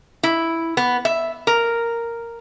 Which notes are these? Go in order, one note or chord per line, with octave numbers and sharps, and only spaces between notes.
E4
B3
E5
A#4